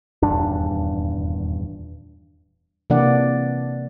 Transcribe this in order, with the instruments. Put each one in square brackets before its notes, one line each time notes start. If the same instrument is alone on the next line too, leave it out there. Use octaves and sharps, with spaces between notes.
[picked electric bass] D#1 E2 G2 D4
[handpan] C3 E3 A#3 D4 D5 F#5